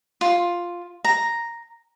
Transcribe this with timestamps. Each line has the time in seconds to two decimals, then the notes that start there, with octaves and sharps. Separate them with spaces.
0.21 F4
1.04 A#5